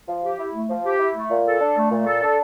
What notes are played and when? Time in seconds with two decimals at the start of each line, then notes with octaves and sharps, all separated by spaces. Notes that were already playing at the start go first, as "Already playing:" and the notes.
0.07 F3
0.23 G4
0.38 E4
0.53 A3
0.69 F3
0.85 G4
0.99 E4
1.15 A3
1.29 A#2
1.45 A4
1.60 D4
1.77 A3
1.91 A#2
2.06 A4
2.22 D4